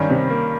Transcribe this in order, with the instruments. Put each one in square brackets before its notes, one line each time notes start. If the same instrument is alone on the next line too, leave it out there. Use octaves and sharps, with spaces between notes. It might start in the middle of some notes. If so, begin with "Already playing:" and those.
Already playing: [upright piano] G2 D#3 G3 C#4
[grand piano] C3
A#3